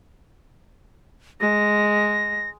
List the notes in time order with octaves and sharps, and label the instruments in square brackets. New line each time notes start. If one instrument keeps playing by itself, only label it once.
[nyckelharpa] G#3 [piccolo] A#6